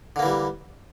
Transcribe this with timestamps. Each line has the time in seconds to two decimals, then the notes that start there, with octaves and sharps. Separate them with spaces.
0.16 D3
0.19 A#3
0.22 E3
0.26 G3